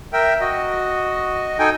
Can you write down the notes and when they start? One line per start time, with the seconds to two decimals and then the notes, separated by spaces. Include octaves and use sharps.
0.13 A#4 E5 G5
0.40 F#4 D#5
1.59 D#4 A4 G5 G#5